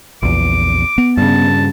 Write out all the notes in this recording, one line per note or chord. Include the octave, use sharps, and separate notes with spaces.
A#1 E2 D6
B3
G2 C#3 A5